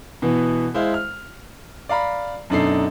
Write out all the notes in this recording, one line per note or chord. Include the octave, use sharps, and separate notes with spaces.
B2 E3 B3
G#3 E4 C5 F5
F6
D5 F5 A#5 B5
F#2 B2 D4 D#4 A4 C7